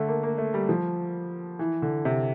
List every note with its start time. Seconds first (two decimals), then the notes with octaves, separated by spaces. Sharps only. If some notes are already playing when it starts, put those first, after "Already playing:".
Already playing: D3 A3
0.08 A#3
0.23 A#3
0.38 A3
0.54 G3
0.69 F3
1.59 E3
1.82 D3
2.05 C3